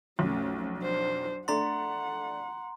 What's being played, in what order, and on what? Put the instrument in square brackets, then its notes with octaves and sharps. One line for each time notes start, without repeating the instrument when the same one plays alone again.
[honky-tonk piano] B1 F2 [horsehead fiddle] A3 C#4
[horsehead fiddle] D4 C5
[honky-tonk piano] A3 D4 A6 [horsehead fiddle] F#5 [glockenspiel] A#5 C6